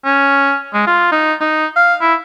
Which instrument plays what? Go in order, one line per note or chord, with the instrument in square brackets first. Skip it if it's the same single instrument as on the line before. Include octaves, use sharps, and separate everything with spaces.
[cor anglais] C#4
G#3
F4
D#4
D#4
F5
E4